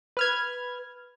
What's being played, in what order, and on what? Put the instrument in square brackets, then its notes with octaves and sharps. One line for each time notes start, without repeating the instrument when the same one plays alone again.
[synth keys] B4 F6 G#6